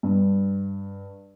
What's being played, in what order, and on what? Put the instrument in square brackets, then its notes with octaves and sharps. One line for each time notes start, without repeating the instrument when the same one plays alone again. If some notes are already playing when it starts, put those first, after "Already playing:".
[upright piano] G2